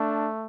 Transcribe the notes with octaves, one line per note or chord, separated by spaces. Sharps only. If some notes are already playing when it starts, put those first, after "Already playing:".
Already playing: A3 D4